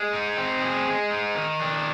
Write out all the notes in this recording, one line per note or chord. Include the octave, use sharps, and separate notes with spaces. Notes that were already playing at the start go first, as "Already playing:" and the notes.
Already playing: G#3
D#4
C4
G#4
G#3
D#4
D#3
D4